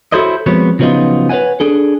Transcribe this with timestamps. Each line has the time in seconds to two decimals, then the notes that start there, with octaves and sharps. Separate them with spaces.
0.12 E4 F#4 A4 C5 C#5 D#5
0.46 F3 G#3 B3 C4 F#4 C#5
0.79 C#3 F3 F#3 B3 D#4 F4
1.29 B4 C#5 E5 F#5 G#5
1.60 D4 G#4 A4